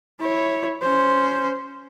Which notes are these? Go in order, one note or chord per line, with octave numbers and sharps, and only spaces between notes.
E4 C#5
C#4 C5